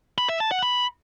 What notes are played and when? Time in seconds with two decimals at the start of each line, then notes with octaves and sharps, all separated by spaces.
0.18 B5
0.29 E5
0.40 A5
0.51 F#5
0.62 B5